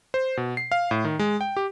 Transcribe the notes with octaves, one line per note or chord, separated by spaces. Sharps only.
C5
B2
C7
F5
A2
D#3
G#3
G5
G4